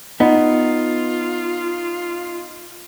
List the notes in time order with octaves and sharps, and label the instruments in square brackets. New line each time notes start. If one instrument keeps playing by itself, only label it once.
[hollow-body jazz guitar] B3 [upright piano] D#4 [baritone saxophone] F4